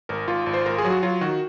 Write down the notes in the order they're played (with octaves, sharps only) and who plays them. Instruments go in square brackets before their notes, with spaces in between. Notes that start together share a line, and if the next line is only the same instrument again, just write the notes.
[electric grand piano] G#1 A#4
G#1 F4
G#1
C5
G#1 A#4
G#4
F#3
F#4
F#3 F4
D#3 F#4